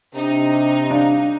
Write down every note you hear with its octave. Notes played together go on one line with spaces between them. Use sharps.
C3 D4 D#4
D4 F5